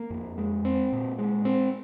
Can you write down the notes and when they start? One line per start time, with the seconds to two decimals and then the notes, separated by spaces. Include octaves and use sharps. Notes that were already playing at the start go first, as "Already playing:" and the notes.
Already playing: A#3
0.10 F2
0.38 G#3
0.65 C4
0.92 A#2
1.18 G#3
1.45 C4